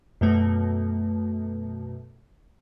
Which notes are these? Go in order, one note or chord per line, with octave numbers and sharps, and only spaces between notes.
F#2 B2 A3